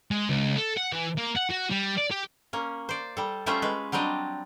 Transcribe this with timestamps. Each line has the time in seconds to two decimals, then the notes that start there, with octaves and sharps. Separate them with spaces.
0.11 G#3
0.29 C#2
0.56 A4
0.77 F#5
0.93 E3
1.18 A#3
1.37 F#5
1.51 F#4
1.71 G3
1.98 D5
2.11 G4
2.53 A#3 C#4
2.89 C5 D5
3.17 G3 A4
3.46 G3 A3 C#4 F4 C5 E5
3.62 G#3 B4
3.92 F#3 G3 C4 D4 D#5